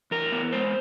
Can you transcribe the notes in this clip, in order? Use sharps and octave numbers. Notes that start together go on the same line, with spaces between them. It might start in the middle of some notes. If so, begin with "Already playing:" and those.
E2 A#4
B3
G#3 C5